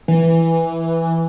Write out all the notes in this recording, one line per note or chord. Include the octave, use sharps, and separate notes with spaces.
E3